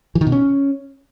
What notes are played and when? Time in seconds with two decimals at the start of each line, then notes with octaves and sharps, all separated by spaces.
0.15 E3
0.21 D#3
0.27 B2
0.32 C#4